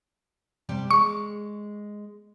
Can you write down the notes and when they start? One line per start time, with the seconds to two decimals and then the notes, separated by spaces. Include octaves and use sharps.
0.69 C3 G3 G4
0.91 G#3 C#6